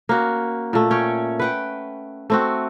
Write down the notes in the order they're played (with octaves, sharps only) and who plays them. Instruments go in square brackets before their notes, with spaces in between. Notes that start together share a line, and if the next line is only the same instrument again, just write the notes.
[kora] A#3 C#4 F#4
A#2 A3
C#4 C#5 G5
B4 F#5 G5
A3 C4 F#4